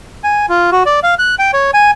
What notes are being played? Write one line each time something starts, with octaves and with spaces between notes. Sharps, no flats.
G#5
F4
F#4
D5
F5
F#6
G5
C#5
G#5